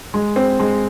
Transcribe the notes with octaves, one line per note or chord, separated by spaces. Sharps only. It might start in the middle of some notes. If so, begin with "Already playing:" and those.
G#3
C4
G#3